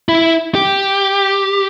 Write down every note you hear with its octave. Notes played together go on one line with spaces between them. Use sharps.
E4
G4